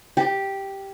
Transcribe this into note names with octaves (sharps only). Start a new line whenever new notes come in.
G4